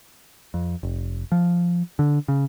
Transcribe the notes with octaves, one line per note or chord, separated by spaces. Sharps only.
F2
F1
F3
D3
C#3